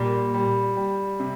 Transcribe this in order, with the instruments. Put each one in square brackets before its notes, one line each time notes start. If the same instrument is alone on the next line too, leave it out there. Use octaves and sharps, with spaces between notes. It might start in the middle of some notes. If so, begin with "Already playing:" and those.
Already playing: [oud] A#2 [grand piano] G3
[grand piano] G3
G3
C3